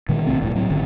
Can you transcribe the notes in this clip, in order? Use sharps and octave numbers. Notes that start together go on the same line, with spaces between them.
A#2 D#3 G#3
B1 C3 A3 C4
E1 C2 A2
A2 F#3 C4
G#1 D3 C4 C#4